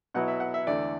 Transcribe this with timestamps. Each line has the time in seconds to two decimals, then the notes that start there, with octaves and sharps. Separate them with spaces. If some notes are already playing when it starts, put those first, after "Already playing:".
0.14 B2 F#3 B3 E4 F#5
0.28 E5
0.40 F#5
0.54 E5
0.67 E2 D3 A3 D5